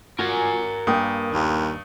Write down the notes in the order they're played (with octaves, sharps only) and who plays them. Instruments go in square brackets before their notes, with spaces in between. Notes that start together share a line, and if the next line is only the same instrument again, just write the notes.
[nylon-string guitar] F4 [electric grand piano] F#4 [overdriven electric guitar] A#4 G#5
[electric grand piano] G2 D#6 [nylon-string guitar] A#3 G5
[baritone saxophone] D#2